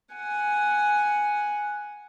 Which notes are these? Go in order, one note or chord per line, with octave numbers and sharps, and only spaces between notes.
F#5 G#5